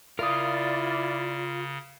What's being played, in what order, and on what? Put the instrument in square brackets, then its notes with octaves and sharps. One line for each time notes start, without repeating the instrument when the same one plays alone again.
[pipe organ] C#3 [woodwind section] E4 D5 [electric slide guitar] F4 [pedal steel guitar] A#4 D#6